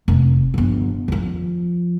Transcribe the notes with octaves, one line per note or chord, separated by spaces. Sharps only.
F1
G1 F3
F2 F3